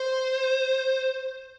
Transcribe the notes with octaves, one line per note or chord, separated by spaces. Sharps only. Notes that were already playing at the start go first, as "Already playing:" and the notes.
Already playing: C5